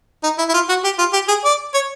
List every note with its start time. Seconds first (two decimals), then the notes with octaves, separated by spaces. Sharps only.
0.23 D#4
0.38 E4
0.49 E4
0.54 F4
0.69 F#4
0.84 G4
0.99 F4
1.13 G4
1.28 G#4
1.44 D5
1.74 C#5